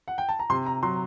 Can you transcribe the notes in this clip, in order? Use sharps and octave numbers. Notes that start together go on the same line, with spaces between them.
F#5
G5
A5
A#5
C3 C6
A#5
F#3 C6